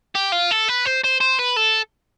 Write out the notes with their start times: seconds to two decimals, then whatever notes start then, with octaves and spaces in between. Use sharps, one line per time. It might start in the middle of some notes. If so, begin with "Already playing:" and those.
0.15 G4
0.32 F4
0.51 A4
0.68 B4
0.85 C5
1.04 C5
1.21 C5
1.39 B4
1.57 A4